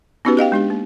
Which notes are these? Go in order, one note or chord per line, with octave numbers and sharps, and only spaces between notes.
B3 C#4 D#4 F#4 G4 B4
G4 D#5 F5 G5
G#3 D4 G4
A#3